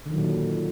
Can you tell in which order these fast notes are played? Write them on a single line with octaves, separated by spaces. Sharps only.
D3 D#3 F#3 A#2